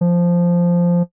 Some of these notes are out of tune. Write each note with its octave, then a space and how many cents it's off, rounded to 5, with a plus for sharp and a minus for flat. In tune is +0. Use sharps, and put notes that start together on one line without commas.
F3 -5